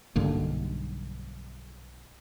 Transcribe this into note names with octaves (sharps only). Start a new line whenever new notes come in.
B1 G2 D3 A#3